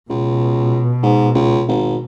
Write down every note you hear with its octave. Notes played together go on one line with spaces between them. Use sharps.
C#2 B2
G#2
C#2
G#1